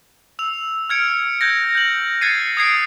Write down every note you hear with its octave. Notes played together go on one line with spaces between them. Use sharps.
E6 F7
F6 G#6 C#7 D7
G6 G#6 A#6
G6 F#7
F#6 G#6 A6 C7 C#7 D#7
D#6 G#6 C7 D7